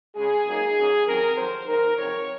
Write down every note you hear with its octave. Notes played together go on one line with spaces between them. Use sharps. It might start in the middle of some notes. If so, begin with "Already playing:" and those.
C#3 G#3 C#4 G#4
A#2 F#3 A#3 D#4
G#2 F#3 C#4
F2 D#3 F#3 C4 A#4
F2 D#3 F#3 C5
G#2 D#3 A#3 D#4 A#4
F2 C#3 F#3 C4 D#4 C#5